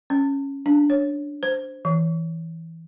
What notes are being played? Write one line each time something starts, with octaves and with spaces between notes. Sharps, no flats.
C#4
D4
C#5
C5
E3